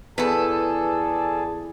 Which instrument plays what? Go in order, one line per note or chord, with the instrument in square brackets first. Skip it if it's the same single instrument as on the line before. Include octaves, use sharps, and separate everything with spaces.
[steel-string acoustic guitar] E2 [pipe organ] G#4 [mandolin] A4 B4 [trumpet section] D5 A5